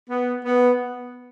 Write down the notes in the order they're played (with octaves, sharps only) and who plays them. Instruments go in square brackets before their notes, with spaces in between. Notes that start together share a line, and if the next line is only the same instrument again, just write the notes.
[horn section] B3
B3